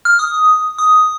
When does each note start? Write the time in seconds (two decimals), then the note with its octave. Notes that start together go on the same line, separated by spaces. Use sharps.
0.05 F6
0.19 D#6
0.78 D#6